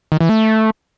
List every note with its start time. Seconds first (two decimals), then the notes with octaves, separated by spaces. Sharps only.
0.12 D#3
0.21 E3
0.29 A3